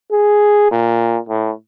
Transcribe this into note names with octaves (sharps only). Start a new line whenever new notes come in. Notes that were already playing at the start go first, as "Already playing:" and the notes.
G#4
A#2
A2